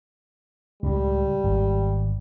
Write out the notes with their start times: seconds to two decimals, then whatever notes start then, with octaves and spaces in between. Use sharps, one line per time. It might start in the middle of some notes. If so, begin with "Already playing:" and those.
0.83 C#2 A2 G3
1.44 G#1